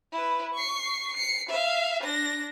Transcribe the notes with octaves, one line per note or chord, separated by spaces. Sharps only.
E4 B4
C#6 C7
C7 C#7
E5 F5
D4 A#6